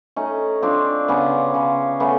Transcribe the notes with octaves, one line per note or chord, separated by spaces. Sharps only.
A3 C#4 D#4
F3 C4 D4
C#3 B3 C#4
C#3
A3 B3 C#4